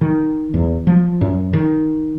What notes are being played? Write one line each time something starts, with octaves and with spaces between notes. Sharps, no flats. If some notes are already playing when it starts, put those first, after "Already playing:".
D#3
E2
F3
F#2
D#3